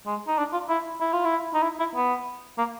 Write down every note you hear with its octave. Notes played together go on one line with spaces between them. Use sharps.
G#3
D#4
D4
F4
E4
E4
F4
E4
D#4
E4
E4
B3
A#3